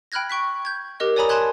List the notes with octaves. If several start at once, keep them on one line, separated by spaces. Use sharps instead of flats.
G5 B5 F6 F#6 G#6 A#6
G5 C#6 F#6 B6
G6 G#6
G4 A#4 D#5 F#6
C#5 D5 G#5 A#5 B5 D#6
G#5 A5 B5 C6 F#6 G#6